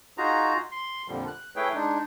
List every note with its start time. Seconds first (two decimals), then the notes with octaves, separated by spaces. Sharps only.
0.18 D#4 F4 F#4 G#4 A#5
0.72 C6
1.08 F2 A#2 D3 F3 G3
1.27 F#6
1.56 A3 E4 G#4 B4 C#5 G5
1.74 G#3 D4 D#4